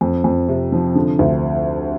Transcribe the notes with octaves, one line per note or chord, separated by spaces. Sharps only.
F2
F2
C3
F3
D3
D2